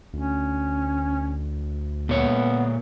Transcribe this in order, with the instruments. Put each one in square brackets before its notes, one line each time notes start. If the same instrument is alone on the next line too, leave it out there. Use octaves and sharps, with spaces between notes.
[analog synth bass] D2 [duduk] C#4
[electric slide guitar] A#2 C#5 [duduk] B3